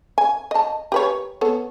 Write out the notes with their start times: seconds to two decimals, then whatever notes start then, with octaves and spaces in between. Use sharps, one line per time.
0.18 G#5
0.51 D#5 A5
0.92 G4 B4 C#5
1.41 B3 A4 C#5